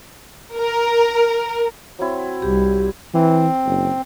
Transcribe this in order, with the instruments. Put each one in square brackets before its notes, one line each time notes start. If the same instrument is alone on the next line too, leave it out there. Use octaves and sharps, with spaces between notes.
[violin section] A#4
[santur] F#3 C4 E4
[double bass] C2 G3 [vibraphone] G4
[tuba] E3 [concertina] C4
[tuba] F#1